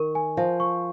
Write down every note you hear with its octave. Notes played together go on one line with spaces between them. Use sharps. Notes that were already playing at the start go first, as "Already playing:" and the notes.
Already playing: D#3 A#4 C#6
G#5
F3 F5
C#6